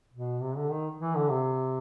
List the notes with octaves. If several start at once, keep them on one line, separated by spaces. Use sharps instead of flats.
B2
C3
D3
D#3
E3
D3
C3